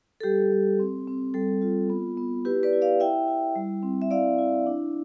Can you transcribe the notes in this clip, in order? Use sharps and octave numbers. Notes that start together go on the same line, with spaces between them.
A4
G3 G4
G3
C4
C4
G3 A4
F4
B3
B3
E4 G4 B4
B4 D5
E4
D5 F5
E4 E5 G5
E4
G3
C4
E5
E4 D5 F5
E4
D4